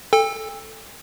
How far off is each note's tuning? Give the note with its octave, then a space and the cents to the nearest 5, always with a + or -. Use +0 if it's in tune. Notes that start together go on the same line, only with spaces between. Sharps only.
A4 +0 G5 +40